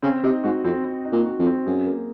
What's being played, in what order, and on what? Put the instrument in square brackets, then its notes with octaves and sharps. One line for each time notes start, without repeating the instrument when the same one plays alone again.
[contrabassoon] C#3 [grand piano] C4
[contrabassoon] C3 [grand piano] D#4
[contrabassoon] G#2 [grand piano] F#4
[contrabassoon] F2 [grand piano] C4
[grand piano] C4
D#4
[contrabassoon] A#2
[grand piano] F#4
[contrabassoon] F2
[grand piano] C4
[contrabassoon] F#2 [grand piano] G#4
[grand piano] A#3